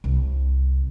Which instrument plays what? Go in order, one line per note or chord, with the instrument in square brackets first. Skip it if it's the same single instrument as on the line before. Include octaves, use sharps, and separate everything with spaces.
[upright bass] C2